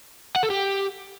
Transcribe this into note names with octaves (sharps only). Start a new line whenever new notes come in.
F#5
A4
G4